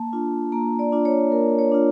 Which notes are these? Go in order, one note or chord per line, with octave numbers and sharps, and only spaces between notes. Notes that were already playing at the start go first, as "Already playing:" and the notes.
Already playing: A#3 A5
D4 F4
A#3 A#5
D5
D4 F4
C#5
A#3 A#4
C#5
D4 F4